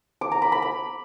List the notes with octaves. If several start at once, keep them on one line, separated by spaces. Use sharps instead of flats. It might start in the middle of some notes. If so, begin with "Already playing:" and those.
D6
A#5
B5
B5
B5